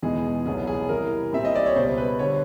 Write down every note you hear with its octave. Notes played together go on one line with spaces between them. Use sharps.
E2 B2 G#3 B3 D#4 G#4
C2 B2 F#3 B3 G#4
G#4
C3 E3 G3 A#4
A#2 G3 C4 E5
D#5
D5
C#5
C#2 B2 G3 C5
B4
D3 G3 C#5